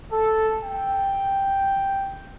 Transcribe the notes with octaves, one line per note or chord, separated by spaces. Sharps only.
A4
G5